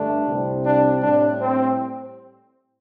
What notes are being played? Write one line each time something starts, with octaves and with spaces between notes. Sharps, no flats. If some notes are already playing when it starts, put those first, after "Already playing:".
Already playing: G2 D3 A3 D4
C2 C3 G3 C4
D4
A2 G3 C4 D4
C4